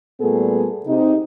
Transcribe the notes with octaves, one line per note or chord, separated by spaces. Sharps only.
A#2 G3 A3 B3 G#4 A4
C3 D#4